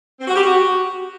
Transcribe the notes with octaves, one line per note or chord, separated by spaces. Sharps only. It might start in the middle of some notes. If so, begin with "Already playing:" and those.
C4
F#4
G4
F#4